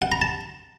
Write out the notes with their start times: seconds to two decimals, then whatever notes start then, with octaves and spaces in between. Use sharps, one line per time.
0.02 F#5
0.12 A#5
0.22 A5